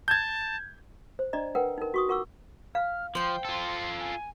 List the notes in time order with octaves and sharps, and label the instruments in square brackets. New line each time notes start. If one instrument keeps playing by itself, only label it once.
[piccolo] A5 [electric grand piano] G6 G#6
[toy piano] C5
D4 D5 D#5 A#5
A#4 B4 F#5 G5
D#4 A#4
F#4 C#6 D#6
F4 A#4 F#5 C#6 D6 E6
[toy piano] F5 [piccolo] F6
[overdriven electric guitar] F3 [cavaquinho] C5 G5 [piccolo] C6
[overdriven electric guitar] F4 A4
[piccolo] G#5